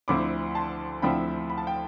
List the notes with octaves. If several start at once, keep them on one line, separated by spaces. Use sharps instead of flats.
D2 D3 F3 C4 E4 B5 D6
A5 C6
D2 D3 F3 C4 E4 G5 B5
B5
A5
G5